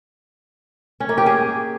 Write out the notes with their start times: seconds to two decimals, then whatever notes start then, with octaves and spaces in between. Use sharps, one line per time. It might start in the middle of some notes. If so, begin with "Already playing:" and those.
1.00 C#4
1.09 A#3
1.18 G4
1.26 G#4